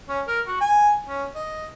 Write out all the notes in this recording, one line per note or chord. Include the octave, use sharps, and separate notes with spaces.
C#4
A#4
F#4
G#5
C#4
D#5